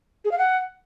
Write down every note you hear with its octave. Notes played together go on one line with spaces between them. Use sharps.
G#4
F5
F#5